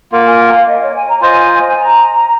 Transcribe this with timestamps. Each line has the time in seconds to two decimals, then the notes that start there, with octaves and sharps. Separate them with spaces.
0.12 A#3 F4 A#4 F#5
0.25 G#5
0.40 F#5
0.53 F5
0.67 D#5
0.80 C#5
0.94 G#5
1.08 A#5
1.21 F4 C5 D#5 G#5
1.75 A#5